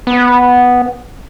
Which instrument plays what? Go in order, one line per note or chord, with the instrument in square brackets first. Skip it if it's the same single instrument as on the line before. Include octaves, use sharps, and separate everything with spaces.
[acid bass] B3